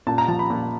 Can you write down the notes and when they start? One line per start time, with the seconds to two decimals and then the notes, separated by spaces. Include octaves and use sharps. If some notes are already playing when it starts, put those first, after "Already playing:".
0.07 A#2 A5
0.18 A#5
0.28 F3 A5
0.39 B5
0.50 A#2